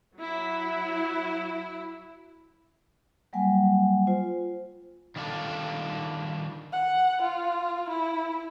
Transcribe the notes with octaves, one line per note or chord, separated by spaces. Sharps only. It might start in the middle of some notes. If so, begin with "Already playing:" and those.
F#3 E4
F#3 G3 A#3 F#5 G#5
F4 C5
D#3 G3 D4 F4 A4
F#5
F4
E4